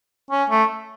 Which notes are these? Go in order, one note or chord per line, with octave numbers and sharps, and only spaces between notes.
C#4
A3